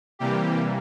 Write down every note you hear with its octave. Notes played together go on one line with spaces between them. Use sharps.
C3 E3 G3 A#3 G4